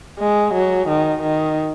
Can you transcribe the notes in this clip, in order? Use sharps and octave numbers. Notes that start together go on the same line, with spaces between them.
G#3
F#3
D#3
D#3